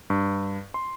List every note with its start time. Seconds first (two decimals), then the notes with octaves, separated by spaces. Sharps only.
0.10 G2
0.74 C6